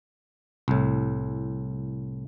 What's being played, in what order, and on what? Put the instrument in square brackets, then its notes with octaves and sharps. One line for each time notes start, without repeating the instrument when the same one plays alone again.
[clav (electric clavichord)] C2 A2